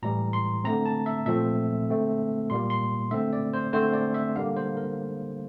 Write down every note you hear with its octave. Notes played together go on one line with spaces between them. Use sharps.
A2 E3 G3 A#5
C6
D3 A3 C4 A#5
A5
E5
A#2 F3 A3 C4 E5
D3 A3 C4
A#2 G3 A#3 C6
C6
D3 A3 C4 E5
D5
C5
D3 A3 C4 C5
D5
E5
D3 G3 A#3 F5
C5
A#4